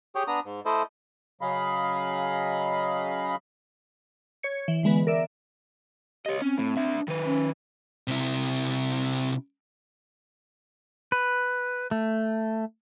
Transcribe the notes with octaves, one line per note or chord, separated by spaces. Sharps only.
G4 G#4 C#5 G5
B3 D4 A#5 D#6
G#2
A3 E4 A4 C5 D#5
C#3 F#3 G#4 D#5 F5 B5
C#5 G#6 C#7
E3
D3 E3 G#3 B3 B4
A#4 D5 E5
G4 C#5 D#5
C4 C#4
A2
D4 E5
D#3 B4
C#4
C3 E4
B4
A3